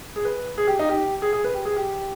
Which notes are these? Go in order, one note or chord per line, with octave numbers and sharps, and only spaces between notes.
G#4
B4
G#4
G4
D#4
G4
G#4
G#4
B4
G4
G#4
G4